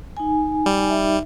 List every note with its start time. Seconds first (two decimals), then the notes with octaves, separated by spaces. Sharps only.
0.17 D#4 G#5
0.66 G3
0.89 D#4 E5